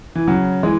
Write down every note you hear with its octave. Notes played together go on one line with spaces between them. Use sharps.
E3
C#3 F#3
E3 G#3